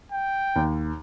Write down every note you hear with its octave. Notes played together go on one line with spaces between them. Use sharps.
G5
D#2